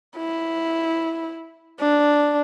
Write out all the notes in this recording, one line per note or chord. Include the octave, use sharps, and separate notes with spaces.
E4
D4